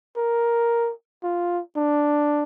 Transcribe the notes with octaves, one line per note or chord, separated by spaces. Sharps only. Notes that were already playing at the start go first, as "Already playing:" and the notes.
A#4
F4
D4